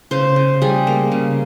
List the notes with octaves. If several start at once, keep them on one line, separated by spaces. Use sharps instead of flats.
C#3 C5
C#3
G3 G#4
A#3
C#3